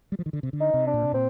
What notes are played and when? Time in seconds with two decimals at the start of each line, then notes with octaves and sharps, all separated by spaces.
0.12 G3
0.19 F3
0.26 D#3
0.33 D3
0.43 C3
0.53 D3
0.60 D#4
0.74 C3
0.87 D4
0.94 A#2
1.03 C3
1.13 A#2 C4